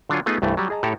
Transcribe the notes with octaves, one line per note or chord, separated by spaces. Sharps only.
D3 F#3 D4 F4 C#5 G#5
A3 B3 D#4 F4 G#4 B4
C2 G2 E3 A3
F#3 G3
G#4 D#5 A5 A#5
A2 G4 A4 C#5 A#5